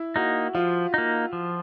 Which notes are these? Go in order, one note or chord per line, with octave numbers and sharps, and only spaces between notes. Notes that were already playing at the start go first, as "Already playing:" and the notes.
Already playing: E4
A#3 D#4 F#4
F3 F4
A#3 D#4
F3